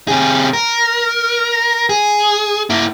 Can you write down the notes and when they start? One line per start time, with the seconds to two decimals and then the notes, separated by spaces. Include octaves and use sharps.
0.08 C3 G#4
0.53 A#4
1.89 G#4
2.70 A#3 E4